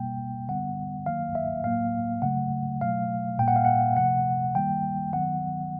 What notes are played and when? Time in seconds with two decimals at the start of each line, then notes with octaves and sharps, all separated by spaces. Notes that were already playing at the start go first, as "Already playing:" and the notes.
Already playing: B2 G3 A#3 G5
0.48 D3 G3 B3 F#5
1.06 D#3 F#3 A#3 F5
1.35 E5
1.64 A2 F#3 A#3 F5
2.22 C#3 F#3 A3 F#5
2.81 B2 F#3 A3 F5
3.38 A#2 G3 A#3 G5
3.48 F#5
3.56 F5
3.65 F#5
3.96 C3 F3 A3 F#5
4.55 D#3 G3 A#3 G5
5.13 D#3 F#3 B3 F#5